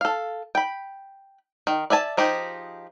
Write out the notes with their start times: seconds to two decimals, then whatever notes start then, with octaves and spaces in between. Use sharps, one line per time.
0.01 A4 F5
0.55 G5 B5
1.67 D#3
1.90 D5 E5 G#5 A5
2.17 F3 D#4 G4 G#4